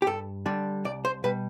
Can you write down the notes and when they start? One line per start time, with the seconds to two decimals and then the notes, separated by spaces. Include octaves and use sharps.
0.02 G4
0.07 G2 A4
0.46 D3 G3 D4
0.85 C2 D5
1.05 C5
1.24 B2 G3 B4